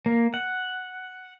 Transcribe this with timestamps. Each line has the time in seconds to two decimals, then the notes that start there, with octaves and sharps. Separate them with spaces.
0.06 A#3
0.34 F#5